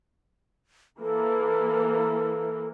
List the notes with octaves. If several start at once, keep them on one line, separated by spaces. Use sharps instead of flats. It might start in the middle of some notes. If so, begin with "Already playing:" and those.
E3 A#3 A4